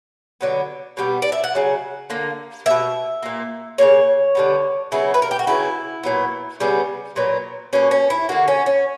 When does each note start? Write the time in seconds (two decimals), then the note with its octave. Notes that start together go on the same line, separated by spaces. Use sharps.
0.41 D3 F#3 B3
0.97 B2 G3 B3
1.22 D5
1.32 E5
1.44 F#5
1.55 C#3 F#3
2.10 D3 A#3
2.66 A#3 E5
2.70 B2
3.23 A#2 A#3
3.78 C#3 G3 A#3 C#5
4.35 D3 G3 B3
4.92 C#3 F#3 B3 E4
5.14 B4
5.22 A#4
5.31 G4
5.39 F#4
5.47 C#3 F#3 B3 E4
6.03 A#2 F#3 B3
6.60 C#3 G3 B3
7.16 A#2 F#3 B3
7.73 B2 A#3 C#4
7.91 C#4
8.10 E4
8.29 D3 A#3 F#4
8.48 C#4
8.66 C#4